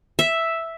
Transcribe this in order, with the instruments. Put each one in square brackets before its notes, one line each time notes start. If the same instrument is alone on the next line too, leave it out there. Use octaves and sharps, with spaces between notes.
[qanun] E5